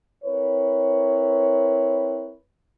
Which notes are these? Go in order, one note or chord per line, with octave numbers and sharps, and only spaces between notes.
C4 E4 A#4 B4 C#5